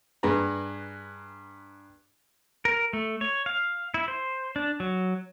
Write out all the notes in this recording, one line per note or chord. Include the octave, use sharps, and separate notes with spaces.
G2 G#4 B4 A#5
A#4
A3
C#5
F5
E4
C5
D4
F#3